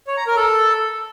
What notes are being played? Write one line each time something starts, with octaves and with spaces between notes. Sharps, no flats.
C#5
A#5
A#4
A4